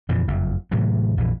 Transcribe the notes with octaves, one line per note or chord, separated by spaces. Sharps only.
F2 A#2 E3
F#1 F2
A2 C3 E3 F#3
A#1 F2 E3